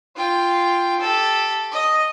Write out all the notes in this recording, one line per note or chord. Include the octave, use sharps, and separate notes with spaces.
F4 G5
G4 A4
D#5